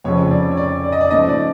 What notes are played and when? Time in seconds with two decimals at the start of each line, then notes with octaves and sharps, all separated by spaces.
0.04 F1 F2 C#3 F3 C#5
0.31 D5
0.51 C#5
0.57 D5
0.84 D5
0.92 D#5
1.01 D5
1.11 G#2 F3 A3 C#4 D#5
1.29 D5